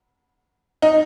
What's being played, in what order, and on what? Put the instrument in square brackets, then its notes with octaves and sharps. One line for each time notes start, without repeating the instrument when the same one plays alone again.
[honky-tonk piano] D#4